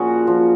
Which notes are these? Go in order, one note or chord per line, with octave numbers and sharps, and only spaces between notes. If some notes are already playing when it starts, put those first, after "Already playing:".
Already playing: A#2 F3 C#4 F#4 G#4
A#2 F3